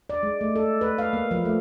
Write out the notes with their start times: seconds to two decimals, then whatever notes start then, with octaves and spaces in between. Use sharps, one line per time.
0.10 D5
0.23 G#3
0.41 A3
0.56 A4
0.81 B4
0.98 F5
1.13 A#3
1.31 F3
1.45 A3